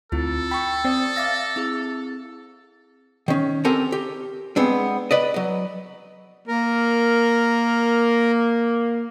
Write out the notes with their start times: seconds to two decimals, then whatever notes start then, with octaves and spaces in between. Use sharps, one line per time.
0.12 D2 C4 E4 F4 A4
0.51 G5 B5 C#6
0.85 C4 D5 D#6
1.16 E5 F5 D6 A6 A#6
1.56 C4 E4 G#4
3.28 D#3 C#4
3.65 C4 G4 A4 A#4 G#5
3.92 G4
4.56 G#3 B3 C4 D4
5.11 B4 D5 D#5
5.34 F#3 D#5
6.48 A#3 A#4